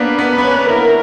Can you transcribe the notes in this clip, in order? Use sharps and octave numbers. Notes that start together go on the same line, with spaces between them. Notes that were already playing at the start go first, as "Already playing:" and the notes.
Already playing: A#3 B3 D4 B4
B3
B4
B3
C#4
E4 A#4